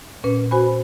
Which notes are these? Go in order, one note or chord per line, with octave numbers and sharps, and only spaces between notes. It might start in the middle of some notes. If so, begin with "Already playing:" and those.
A#2 C#4 B4
F#4 C5 G#5 B5